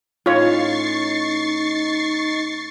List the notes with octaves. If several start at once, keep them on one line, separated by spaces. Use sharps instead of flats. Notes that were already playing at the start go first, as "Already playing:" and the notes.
A2 C#4 D#4 F4 C#5 C#6 A6 C7